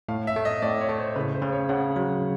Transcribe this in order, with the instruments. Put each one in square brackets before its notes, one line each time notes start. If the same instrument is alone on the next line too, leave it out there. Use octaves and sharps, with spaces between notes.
[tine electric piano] A2 [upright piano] F5
[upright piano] E5
[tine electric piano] A3
[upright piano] D#5
[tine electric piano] A2 [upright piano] D5
[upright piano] C#5
[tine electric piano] A3
[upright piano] C5
[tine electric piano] C#3 [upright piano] B4
[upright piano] C5
[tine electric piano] C#3
[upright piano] C#5
[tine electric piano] C#3 [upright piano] F#5
[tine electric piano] F#3